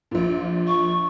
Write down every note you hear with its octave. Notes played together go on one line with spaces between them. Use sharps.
A#1 A#2
C#6